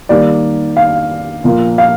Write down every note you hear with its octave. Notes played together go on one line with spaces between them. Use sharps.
D#3 G3 A#3 D5
F5
A#2 F3 A#3
F5